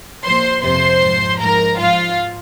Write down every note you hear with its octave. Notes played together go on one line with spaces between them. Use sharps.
A#2 F3 C5 C6
F2 C3 F3 C5 C6
G#2 F3
G#2 F3 A#4 A#5
G#2 F3 F4 F5